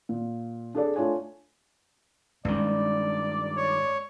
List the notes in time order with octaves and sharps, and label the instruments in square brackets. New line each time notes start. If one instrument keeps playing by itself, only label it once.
[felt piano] A#2
D4 G#4 A4 D5
A3 D4 F4 C#5 G#5
[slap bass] G2 D#3 [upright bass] G#3 C#4 [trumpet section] D5
[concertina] C#5